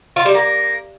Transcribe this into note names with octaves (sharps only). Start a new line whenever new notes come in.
F4
G3
A#3